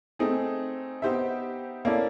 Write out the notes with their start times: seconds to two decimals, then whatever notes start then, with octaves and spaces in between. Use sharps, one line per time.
0.19 A3 C4 D#4 G#4
1.02 B3 D#4 G4 C5 E5
1.85 A#3 C#4 E4 A4 D5